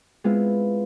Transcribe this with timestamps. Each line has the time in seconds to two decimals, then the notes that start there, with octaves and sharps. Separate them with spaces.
0.24 G#3 B3 C4 E4 F4